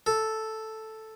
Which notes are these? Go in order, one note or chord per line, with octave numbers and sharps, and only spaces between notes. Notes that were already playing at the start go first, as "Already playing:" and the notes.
A4